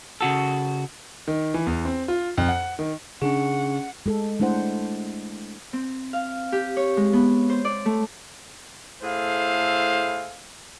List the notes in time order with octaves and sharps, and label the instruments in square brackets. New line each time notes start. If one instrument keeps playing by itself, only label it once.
[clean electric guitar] C#3 F#4 A4
[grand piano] D#3
E3
E2
C4
F4
F2
F#5
D#3
[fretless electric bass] C#3 D4 [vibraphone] C#4 [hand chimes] G#4 [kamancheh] F#5
[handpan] G#3 A4
G#3 A3 D4 E4 C5 F#5
[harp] C4
F5
G4
C#5
G#3
B3
C5
D5
A3
[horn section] A2 E4 G#4 A4 C5 F5